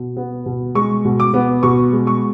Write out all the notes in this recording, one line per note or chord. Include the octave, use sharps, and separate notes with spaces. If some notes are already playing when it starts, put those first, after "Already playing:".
Already playing: B2
B3
B2
G#3 C#6
B2
D6
B3
B2 C#6
G#3
C#6